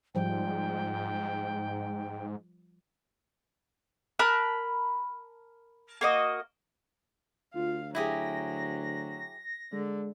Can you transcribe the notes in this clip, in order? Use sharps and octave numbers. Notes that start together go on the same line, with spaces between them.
G#2 F3 G3 G5
A#4 A5 B5 F#6
A#3 F#4 D#5
D2 F4 F5
F#3 E4 G4 G#4 A#6
D3 G#3